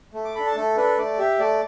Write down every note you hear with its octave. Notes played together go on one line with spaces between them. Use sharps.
A3
D6
D4 A4 B5
A5
A3 A4
D4 A4 B4
A3 D5
G4 E5
A3 D5